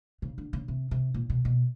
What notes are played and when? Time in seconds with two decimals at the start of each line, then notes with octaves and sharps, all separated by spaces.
0.22 C#3
0.38 D3
0.53 C#3
0.68 C3
0.91 C3
1.14 A#2
1.30 B2
1.45 B2